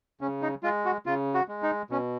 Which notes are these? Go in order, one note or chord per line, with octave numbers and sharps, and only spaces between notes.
C#3 C#4
D#4
G#3 F4
F#4
C#3 F4
F#4
G#3
D#4
B2 C#4